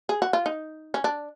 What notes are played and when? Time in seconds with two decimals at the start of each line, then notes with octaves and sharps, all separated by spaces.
0.09 G#4
0.22 F#4
0.33 F4
0.46 D#4
0.94 C#4
1.04 D4